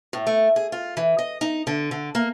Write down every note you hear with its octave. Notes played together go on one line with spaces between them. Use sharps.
A2
A3
G#4
F4
E3
D#5
D#4
D3
D3
A#3